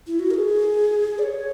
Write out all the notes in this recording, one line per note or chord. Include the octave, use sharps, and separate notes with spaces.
E4
F#4
A#4
G#4
D5
C#5